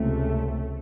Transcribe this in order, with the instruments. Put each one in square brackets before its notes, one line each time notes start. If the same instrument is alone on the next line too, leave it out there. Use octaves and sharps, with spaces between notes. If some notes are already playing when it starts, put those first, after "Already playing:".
Already playing: [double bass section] C#2 C3 A3